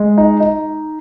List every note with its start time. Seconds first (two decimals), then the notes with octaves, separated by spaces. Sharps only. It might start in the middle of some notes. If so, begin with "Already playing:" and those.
Already playing: G#3
0.18 D#4
0.40 D#4